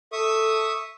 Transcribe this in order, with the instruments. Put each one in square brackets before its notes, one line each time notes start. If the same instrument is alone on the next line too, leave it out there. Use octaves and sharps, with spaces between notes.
[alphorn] A4 [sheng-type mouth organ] E5 C#6 D#6